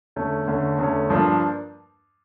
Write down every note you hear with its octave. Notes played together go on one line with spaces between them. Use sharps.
E2 D3 A3 C#4
E2 D3 A3 C#4
E2 D3 A3 C#4
G2 F3 A#3 D4